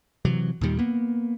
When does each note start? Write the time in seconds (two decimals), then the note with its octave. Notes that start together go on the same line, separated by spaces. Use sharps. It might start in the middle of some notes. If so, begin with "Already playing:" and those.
0.25 C3 E3 F#3
0.61 D#2 A#2 D#3 G3
0.79 A#3 B3